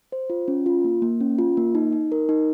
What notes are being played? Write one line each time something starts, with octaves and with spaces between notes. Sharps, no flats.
C5
F4
C#4
F4
A#3
A#3
C#4
F4
A#3
D#4
D#4
A#4
D#4